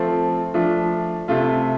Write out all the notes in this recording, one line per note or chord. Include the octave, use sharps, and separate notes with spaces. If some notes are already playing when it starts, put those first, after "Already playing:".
Already playing: F3 A3 C4 A4
F3 A3 D4
C3 A3 F4